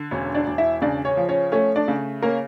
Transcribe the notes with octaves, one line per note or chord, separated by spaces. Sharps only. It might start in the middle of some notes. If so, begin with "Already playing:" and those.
Already playing: D3
E1 C#4 C#5
D4 D5
E1
E4 E5
C#3 D4 D5
C#4 C#5
F3
C#4 C#5
A3 C#4 C#5
D4 D5
C#3
A#3 C#4 A#4